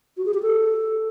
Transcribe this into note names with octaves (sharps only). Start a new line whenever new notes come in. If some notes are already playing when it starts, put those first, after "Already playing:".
F#4
G#4
G4
A4